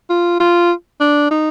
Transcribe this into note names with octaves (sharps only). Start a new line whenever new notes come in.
F4
F4
D4
D#4